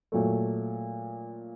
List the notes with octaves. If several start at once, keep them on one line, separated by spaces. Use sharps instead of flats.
A#2 F#3 A3